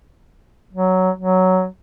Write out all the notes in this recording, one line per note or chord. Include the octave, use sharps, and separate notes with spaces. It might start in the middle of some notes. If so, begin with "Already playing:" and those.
F#3
F#3